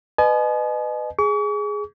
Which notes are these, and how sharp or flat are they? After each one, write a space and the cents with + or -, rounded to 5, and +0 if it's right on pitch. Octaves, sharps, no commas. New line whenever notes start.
B4 +15 D#5 -30 G#5 +40
G#4 +0 C#6 +45